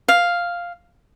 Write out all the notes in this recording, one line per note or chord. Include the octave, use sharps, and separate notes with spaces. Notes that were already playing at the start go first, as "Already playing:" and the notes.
F5